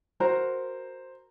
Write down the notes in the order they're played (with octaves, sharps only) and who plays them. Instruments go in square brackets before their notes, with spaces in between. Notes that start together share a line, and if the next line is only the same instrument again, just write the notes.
[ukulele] F#4 A#4 A#5 [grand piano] C5